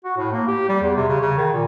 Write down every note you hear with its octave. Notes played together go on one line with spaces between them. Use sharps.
F#4
A2
A#3
G4
G3
E2
C3
C#3
C#3
D#3
A#2